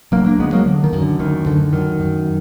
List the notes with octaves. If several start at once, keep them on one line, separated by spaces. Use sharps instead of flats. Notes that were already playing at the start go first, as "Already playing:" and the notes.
D2 F#3 A#3
A#3 D4
D2 G#3 B3
F#3 A#3
D3
D#3
F#2
D3
D2 D#3
D3
F#2 D#3
F#2